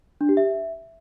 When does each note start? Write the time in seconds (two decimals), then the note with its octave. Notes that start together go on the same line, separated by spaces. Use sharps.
0.21 D4
0.29 G4
0.37 E5